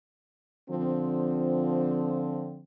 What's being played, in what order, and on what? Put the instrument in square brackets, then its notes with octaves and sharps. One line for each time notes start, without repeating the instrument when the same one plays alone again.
[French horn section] D3 F3 C4